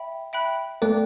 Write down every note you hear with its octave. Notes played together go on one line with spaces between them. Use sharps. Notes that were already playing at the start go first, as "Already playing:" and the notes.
Already playing: E5 G5 B5
E5 G5 B5 F#6
A3 A4 D5 G5 D6 F#6